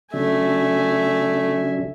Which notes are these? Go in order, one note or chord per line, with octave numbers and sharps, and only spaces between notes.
C#3 F#3 A3 D4 E5 G#5